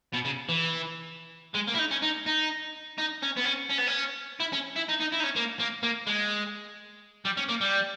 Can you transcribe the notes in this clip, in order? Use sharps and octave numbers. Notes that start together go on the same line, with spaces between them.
B2
C#3
E3
G#3
A#3
E4
D#4
C#4
D#4
D#4
D#4
C#4
B3
C#4
C#4
B3
C#4
E4
C#4
E4
D#4
D#4
E4
D#4
C#4
A#3
A#3
A#3
G#3
G3
C#4
A#3
G3